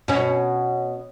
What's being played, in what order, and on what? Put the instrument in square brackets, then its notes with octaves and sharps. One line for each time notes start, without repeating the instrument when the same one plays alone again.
[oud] B2 C#4